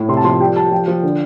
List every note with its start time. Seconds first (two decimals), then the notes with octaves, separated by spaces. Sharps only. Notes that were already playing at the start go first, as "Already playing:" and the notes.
Already playing: A2
0.09 C3 C6
0.17 A5
0.24 F3 C6
0.40 G3 G5
0.56 G3 A5
0.71 F3 G5
0.88 F3
1.03 D3